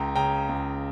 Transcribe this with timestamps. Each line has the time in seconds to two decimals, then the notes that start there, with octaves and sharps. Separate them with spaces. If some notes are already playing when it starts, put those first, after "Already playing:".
Already playing: C#2 G5 A#5
0.16 C#3 G5 A#5
0.49 C#2